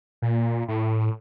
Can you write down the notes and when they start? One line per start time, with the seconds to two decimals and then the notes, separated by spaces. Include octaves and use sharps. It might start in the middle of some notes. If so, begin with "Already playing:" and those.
0.22 A#2
0.68 A2